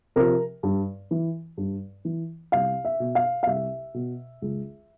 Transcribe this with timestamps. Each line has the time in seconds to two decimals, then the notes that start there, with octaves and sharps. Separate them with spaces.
0.16 C3 F3 A#4
0.63 G2
1.11 E3
1.57 G2
2.05 E3
2.52 C2 F5
2.85 E5
3.00 B2
3.15 F5
3.43 F5
3.47 C2 E5
3.94 B2
4.42 C#2